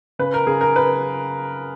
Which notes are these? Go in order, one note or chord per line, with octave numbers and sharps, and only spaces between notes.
C#3 B4
A#4
C#3 G#4
A#4
B4